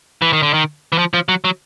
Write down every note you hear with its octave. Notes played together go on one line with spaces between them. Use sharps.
E3
D#3
D3
D#3
E3
F3
F3
F#3
F#3